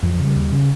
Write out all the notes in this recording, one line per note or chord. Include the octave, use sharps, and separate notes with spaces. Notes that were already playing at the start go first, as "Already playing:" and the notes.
F2 F3
F3
C#3
G3
D#2
C#3